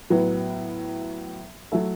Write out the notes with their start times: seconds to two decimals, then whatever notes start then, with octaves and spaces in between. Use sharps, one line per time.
0.10 A2 F#3 B3
1.72 F#3 A3 E4 A4